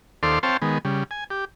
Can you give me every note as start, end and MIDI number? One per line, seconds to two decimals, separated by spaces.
0.23 0.39 39
0.23 0.39 69
0.23 0.39 72
0.23 0.39 74
0.23 0.39 77
0.23 0.39 84
0.43 0.57 60
0.43 0.57 72
0.43 0.57 73
0.43 0.57 77
0.43 0.57 79
0.43 0.57 81
0.62 0.78 51
0.62 0.78 56
0.62 0.78 59
0.85 1.04 49
0.85 1.04 55
1.11 1.24 80
1.30 1.45 67